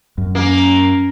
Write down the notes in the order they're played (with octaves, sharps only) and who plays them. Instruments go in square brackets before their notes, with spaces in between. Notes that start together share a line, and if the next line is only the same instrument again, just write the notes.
[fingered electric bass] F#2
[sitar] A#3 [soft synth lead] C#4